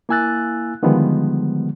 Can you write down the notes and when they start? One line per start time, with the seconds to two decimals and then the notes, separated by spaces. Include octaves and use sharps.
0.09 A#3 E4 G#5 E6 F#6 A6
0.83 D3 D#3 F3 G3 G#3 B3